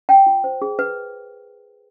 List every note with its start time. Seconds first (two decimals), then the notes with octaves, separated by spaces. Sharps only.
0.09 G5
0.26 F4
0.44 C5
0.62 G#4
0.79 B4